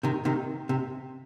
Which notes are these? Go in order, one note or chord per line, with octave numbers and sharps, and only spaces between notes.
C3 D#3
C3 D#3
C3